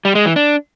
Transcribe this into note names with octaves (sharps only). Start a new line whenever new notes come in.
G3
G#3
E3
D4